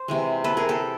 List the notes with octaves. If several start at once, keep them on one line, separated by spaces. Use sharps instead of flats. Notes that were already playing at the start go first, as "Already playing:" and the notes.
Already playing: C5
C3 E3 G#3
A4 B4
G#4 A#4
G4 A4